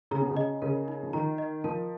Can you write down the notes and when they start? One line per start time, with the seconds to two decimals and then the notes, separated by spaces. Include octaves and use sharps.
0.11 C#3 A#5
0.21 B2
0.31 C#3
0.37 D#5
0.62 C#3 A#4
0.88 D#4
1.03 F3
1.13 D#3 A#5
1.38 D#5
1.64 F3 A#4